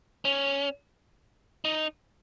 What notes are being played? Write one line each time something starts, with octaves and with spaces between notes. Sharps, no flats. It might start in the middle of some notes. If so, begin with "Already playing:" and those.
C#4
D#4